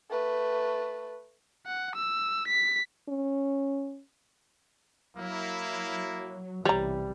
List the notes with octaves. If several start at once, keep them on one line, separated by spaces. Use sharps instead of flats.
A3 B4
F#5
E6
B6
C#4
F#3 A#3 E4
B1 C3 E3 G3 C#5 A#5